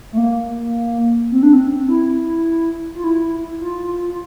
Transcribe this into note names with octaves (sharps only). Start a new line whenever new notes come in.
A3
A#3
C4
D4
C4
E4
F4
E4
F4
F4